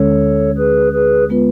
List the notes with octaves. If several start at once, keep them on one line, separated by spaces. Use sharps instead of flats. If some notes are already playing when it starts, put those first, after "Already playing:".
Already playing: D2 D3 G#3 C#4 A4 C#5
G#4 B4
G#4 B4
G#3 B3 F4 B4